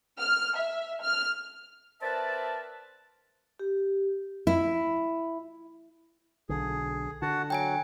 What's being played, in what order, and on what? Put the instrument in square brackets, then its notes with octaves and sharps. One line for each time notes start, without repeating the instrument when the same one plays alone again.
[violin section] F6
E5
F6
[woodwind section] C4 A#4 B4 D5 E5 A5
[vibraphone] G4
[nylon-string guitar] E4
[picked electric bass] B1 D3 [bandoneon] G#4
[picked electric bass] D3 [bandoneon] F#4 F#5 A5
[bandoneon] F#3 [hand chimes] G5 G#5 D7